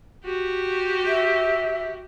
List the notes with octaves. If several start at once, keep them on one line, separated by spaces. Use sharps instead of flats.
F#4 G4
E5